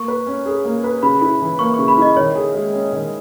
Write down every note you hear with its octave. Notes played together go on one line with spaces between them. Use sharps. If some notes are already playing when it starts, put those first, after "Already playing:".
Already playing: A#3 C#6
B4
C#4
G#4
A#3
B4
C#3 B5
E4
E3
A#3 C#6
C#3 C#6
B5
E4 D#5
D#3 C#5
G#4
G#3
C#4
D#3